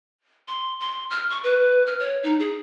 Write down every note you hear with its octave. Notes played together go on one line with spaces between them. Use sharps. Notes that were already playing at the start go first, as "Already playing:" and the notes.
C6
C6
F6
C#6
B4
F6
C#5
D#4
G#4